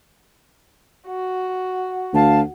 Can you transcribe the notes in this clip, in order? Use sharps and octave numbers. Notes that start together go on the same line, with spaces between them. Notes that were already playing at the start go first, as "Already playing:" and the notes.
F#4
D2 F5 A5